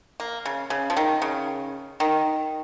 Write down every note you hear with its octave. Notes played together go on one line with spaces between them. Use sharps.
A#3
C#3
C#3
F3
D#3
C#3
D#3